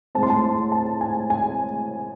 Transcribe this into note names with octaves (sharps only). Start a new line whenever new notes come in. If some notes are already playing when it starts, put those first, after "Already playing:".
A2 G#3 C4 A5
C6
A5
C6
A5
G#5
G#5